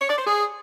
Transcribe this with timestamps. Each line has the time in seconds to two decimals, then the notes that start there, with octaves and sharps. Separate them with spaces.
0.01 C#5
0.10 D5
0.18 C5
0.27 G#4